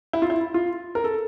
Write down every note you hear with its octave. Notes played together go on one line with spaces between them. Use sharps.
E4
F4
E4
F4
A#4
A4